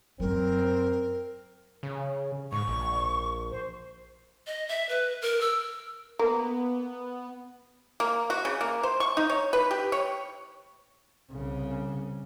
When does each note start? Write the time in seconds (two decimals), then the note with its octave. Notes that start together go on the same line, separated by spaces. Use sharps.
0.20 F#2 F#3 C4 A#4
1.83 C#3
2.52 G#2 C#6
2.68 A#1
3.51 C5
4.47 D#5
4.69 E5
4.89 B4
5.22 A#4
5.41 E6
6.19 A#3 B3
8.00 A#3
8.30 F#4
8.45 C#3
8.61 A#3
8.83 C5
9.00 C#6
9.17 D#4
9.30 C#5
9.53 B4
9.71 G4
9.92 C#5
11.32 C2 C#3